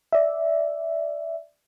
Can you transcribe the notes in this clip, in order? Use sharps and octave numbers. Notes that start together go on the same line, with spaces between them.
D5 E5